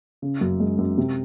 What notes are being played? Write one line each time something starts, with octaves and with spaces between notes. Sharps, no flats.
C#3
F#2
G#3
F#2
C3